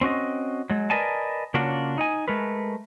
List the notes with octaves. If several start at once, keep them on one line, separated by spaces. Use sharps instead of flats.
C4 C#4 F#4 D#5
F#3 G#3
A#4 B4 D5 D#5 G#5 A5
C#3 A#3 C#4 D4 F4 F#4
D#4 D#5 G#5
G#3 A3 A#4 B4